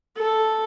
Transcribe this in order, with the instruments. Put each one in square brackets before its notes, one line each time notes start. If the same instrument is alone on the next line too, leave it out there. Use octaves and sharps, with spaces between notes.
[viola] A4